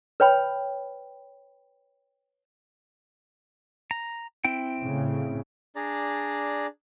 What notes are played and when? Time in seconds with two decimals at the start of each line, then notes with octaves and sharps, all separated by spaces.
0.20 B4 C#5 G5 B5
3.91 A#5
4.45 C4 E4 G5
4.82 A2 C#3
5.76 D4 G#4 D5 A#5